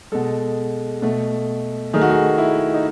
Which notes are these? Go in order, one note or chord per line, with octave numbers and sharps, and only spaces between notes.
B2 G#3 A4
B2 A3
D#3 A3 G#4
F#4
G#4
E4
D#4